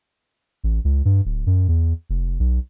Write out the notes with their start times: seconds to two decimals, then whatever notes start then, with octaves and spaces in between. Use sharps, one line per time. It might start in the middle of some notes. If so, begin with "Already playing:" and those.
0.64 A1
0.85 C#2
1.05 G2
1.25 D1
1.47 F#2
1.68 E2
2.10 F1
2.40 B1